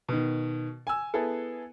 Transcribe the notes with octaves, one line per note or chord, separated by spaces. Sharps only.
B2 D#3
G#5 E6
B3 E4 G#4 A4